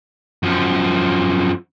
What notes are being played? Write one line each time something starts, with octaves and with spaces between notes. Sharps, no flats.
F#2 F3